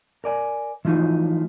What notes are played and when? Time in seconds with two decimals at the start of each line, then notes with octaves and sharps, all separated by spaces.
0.24 A#4 D5 G#5
0.85 E3 F3 A3 D#4 F#4